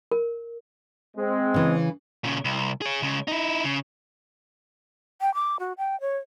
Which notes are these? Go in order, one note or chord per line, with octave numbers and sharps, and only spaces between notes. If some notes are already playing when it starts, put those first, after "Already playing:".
A#4
G#3 C4
C#3 E3
A#2 C#3
C2
G#4 C#5
C#2 C#3
D#4 E4
C#3
G5
D6
F#4
G5
C#5